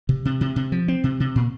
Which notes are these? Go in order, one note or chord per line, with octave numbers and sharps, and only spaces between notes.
C3
C3
C3
C3
F3
C4
C3
C3
A#2